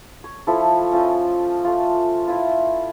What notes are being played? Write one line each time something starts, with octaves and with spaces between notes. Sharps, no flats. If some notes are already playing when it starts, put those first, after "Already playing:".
C#5
F3 E4 A4
C#4 F4 C5 D#5
A3 F4
E4 F4 B4